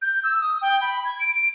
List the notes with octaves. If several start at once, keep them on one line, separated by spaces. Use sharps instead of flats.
G6
E6
D#6
G5
B5
G#6
D7